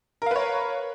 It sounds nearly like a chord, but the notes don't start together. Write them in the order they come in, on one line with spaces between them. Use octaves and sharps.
A#4 F5 B4 C#5